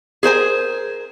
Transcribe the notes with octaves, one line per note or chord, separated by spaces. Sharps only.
G#4 A#4 C5 G#5